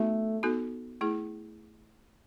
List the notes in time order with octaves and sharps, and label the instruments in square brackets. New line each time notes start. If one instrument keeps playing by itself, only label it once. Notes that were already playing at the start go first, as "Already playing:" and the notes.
Already playing: [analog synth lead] A3 [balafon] B3 D#4 F#4 A4
[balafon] B3 D#4 F#4 A4
A3 E4 G#4